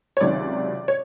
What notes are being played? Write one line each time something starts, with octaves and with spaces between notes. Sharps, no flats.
C#5
C#2 C3 D#3 F#3 D5
C#5